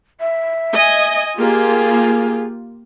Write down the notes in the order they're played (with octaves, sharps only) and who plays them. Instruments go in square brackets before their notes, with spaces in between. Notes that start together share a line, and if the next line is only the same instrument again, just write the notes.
[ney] E5
[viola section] D#5 G#5
[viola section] A#3 F4 G4 [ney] G#4